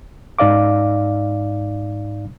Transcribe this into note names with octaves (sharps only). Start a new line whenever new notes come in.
G#2 D#4 D5 F5 D6